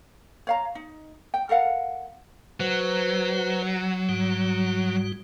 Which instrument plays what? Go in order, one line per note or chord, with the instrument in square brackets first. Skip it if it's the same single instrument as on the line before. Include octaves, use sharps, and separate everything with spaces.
[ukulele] C#5 F5 A#5
D#4
G5
A4 A#4 F5 F#5
[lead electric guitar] F#3 [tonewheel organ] B4 C5
[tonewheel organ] G#2 G3 F#4